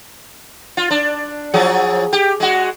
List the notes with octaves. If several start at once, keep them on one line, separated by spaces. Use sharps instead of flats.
F4
D4
F3 F#3 G#4
G4
G#3 F#4